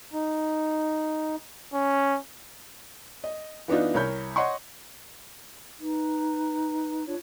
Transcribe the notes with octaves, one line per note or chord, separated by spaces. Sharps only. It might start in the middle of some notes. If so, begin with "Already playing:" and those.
D#4
C#4
D#5
E3 B3 D4 D#4 F4
C2 A#4 C#5 B5 G6
C#5 D#5 F#5 C6 C#6
D#4 B4
D4 F4 C#5